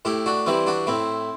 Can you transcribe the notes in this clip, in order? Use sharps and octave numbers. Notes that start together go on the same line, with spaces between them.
A2 E4 G4
D4 F#4
E3 G3 C4 E4
D4 F#4
A2 C4 E4